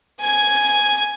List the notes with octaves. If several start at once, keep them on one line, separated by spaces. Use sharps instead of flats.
G#5 G#6